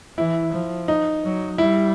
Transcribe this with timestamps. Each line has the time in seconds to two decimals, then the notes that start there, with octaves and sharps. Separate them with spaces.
0.18 E3 E4
0.52 F3
0.88 D#4
1.24 F#3
1.58 G3 E4